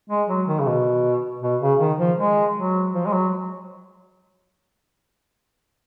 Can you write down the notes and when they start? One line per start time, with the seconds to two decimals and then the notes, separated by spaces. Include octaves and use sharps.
0.10 G#3
0.28 F#3
0.47 D#3
0.60 C#3
0.66 B2
1.42 B2
1.61 C#3
1.80 D#3
1.99 F3
2.18 G#3
2.56 F#3
2.94 F3
3.06 G#3
3.13 F#3